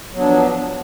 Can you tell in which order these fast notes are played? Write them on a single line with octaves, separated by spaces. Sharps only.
F#3 B3 D4 F3